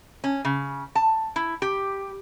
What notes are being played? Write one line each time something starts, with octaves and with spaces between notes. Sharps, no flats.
C#4
C#3
A5
E4
G4